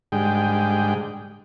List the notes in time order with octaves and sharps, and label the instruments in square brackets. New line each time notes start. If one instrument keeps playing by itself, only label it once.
[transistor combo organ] G#2 D3 G3 G#3 G5